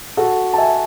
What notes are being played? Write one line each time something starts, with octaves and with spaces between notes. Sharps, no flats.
F#4 A4
A5
E5 G#5